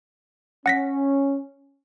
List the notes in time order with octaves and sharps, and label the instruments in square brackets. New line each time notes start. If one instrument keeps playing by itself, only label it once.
[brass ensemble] C#4 [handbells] F#5 A#6 B6